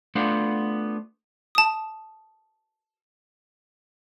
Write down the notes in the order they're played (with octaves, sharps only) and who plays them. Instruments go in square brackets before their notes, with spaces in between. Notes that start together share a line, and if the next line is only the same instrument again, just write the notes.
[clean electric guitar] A3 B3 D4 F4 C5 F#5
[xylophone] A5 D#6